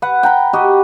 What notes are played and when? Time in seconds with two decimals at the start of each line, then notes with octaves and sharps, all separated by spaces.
0.02 B4 F#5
0.23 G5 A#5 B5
0.53 F#4 G4 D#5